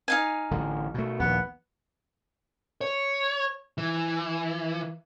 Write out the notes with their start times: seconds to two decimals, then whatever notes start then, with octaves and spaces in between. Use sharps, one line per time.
0.08 D#4 F5 G#5
0.51 A1 D3
0.94 B2 A3
1.20 A#1 D#2 B3
2.81 C#5
3.78 E3